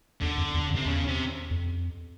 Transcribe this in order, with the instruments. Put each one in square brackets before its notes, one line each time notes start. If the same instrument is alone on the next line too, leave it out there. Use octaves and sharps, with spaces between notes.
[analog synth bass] E2 [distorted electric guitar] D3
[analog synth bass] F2
E2
F2
[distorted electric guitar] C3
[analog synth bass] E2 [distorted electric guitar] C#3
[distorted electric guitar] C3
[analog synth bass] F2